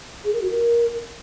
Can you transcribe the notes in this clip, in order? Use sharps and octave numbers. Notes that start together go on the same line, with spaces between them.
G#4
A#4
F#4
A#4